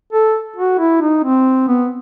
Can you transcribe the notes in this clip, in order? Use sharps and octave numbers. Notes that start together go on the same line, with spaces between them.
A4
F#4
E4
D#4
C4
B3